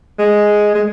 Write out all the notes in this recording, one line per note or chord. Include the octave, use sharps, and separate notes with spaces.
G#3
G#3